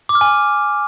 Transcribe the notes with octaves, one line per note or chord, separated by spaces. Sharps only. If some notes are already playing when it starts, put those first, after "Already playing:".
D6
F6
G#5